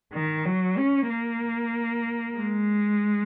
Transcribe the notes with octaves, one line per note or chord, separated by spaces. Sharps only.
D#3
F#3
C#4
A#3
G#3